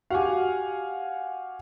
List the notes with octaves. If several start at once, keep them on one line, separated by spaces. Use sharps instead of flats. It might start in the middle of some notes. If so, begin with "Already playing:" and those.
F#4 G4 F5 F#5 G#5